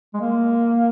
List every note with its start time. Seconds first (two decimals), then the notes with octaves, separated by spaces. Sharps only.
0.14 G#3
0.20 A#3